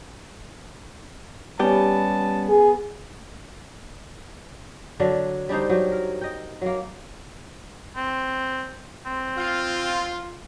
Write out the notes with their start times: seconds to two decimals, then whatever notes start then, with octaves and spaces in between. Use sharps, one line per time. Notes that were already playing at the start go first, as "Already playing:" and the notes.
1.59 G3 B3 C#4 G4 A5
2.49 G#4
5.00 D3 F#3 D4
5.49 G3 D4 D#4 C5
5.69 F#3 G4
5.92 A#4
6.21 D#5 G5
6.61 F#3 A#3
7.96 C4
9.06 C4
9.38 F4